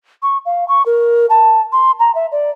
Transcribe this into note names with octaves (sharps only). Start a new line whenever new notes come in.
C#6
F5
C#6
A#4
A5
C6
A#5
E5
D5